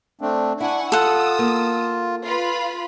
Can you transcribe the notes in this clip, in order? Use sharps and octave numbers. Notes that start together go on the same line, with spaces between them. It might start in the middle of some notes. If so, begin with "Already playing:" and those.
A3 C4 D4
D4 E4 F#5 G#5 C#6
F4 A4 F#5 D#6 E6
A#3
F4 B4 B5